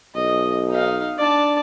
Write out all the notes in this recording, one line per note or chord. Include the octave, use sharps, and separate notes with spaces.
B1 D#5
D#4 F5
D4 D5 A5